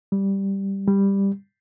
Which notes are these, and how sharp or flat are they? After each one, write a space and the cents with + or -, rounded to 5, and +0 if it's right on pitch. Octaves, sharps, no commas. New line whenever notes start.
G3 +0
G3 +10